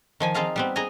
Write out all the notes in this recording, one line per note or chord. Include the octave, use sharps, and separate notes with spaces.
D#3 F3 G#5
C4 D#4 F4 G#4 F5 A#5
G3 B3 C4
G#4 D#5 G#5 A#5